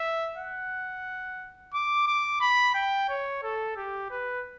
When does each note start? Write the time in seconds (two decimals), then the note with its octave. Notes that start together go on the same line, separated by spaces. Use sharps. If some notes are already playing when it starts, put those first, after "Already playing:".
Already playing: E5
0.37 F#5
1.74 D6
2.07 D6
2.41 B5
2.74 G5
3.09 C#5
3.43 A4
3.77 G4
4.11 B4